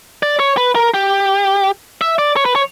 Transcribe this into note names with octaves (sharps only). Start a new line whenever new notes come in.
D5
C#5
B4
A#4
G4
E5
D5
C#5
B4
C#5